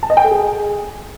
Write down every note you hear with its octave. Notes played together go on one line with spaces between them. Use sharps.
A5
D#5
G5
A4
G#4